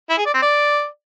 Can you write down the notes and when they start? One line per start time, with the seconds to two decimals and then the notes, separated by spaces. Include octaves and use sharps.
0.10 E4
0.18 G#4
0.26 D5
0.34 C4
0.42 D5